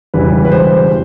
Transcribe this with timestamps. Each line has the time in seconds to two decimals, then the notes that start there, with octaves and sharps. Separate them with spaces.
0.14 E1 E2 C#3 E3 G3 B4
0.45 B4
0.52 C5